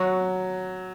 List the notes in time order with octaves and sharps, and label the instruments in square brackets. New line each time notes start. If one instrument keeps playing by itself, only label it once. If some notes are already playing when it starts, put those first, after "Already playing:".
Already playing: [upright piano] F#3 [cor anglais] F#4